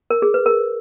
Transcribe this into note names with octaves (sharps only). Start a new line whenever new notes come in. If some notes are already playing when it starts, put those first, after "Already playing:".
A#4
G#4
B4
A#4